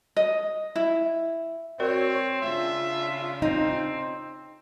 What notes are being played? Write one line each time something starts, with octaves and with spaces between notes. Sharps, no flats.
D#5
E4
C4 F#4 A#4 C#5 D5
C#3 D4 F4 E5
C4 D#4